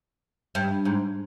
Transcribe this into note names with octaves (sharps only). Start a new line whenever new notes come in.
G2
G#2